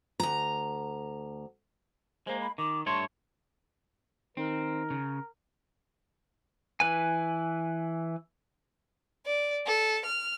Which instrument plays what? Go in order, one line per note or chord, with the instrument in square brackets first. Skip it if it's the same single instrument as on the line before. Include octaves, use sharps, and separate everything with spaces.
[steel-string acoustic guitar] D2 A#5
[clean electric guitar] G#3 A#3 [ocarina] C5
[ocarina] B5
[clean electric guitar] D#3 [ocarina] D6
[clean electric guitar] G2 A3 C#5 [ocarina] C6
[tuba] D#3 [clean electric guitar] C4 [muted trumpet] A#4
[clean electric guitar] C#3
[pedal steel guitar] E3 B4 G#5
[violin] D5
A4
F6